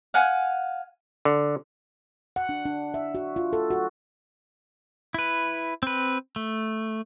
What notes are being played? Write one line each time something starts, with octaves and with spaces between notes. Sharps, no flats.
F5 F#5 G#5
D3
F#5
D4
D4
E5
F#4
F4
A4
F#4
E4 B4
C4 B4
A3